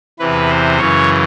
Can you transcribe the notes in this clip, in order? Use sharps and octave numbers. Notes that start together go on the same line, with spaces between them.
E2 C3 E3 B4
C5
F#2 C#3 E3 C#5